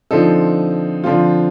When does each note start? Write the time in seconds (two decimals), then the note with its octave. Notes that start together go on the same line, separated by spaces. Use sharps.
0.11 D3 F3 C4 D#4 A4
1.04 D3 F3 C4 F4